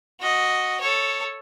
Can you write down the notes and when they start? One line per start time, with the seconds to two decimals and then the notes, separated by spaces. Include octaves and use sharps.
0.21 F#4 D#5
0.81 A4 C#5